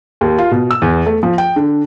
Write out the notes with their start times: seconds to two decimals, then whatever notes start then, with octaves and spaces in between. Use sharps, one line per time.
0.21 D#2
0.38 F4
0.51 B2
0.71 E6
0.82 E2
1.06 A3
1.23 F3
1.38 G5
1.56 D3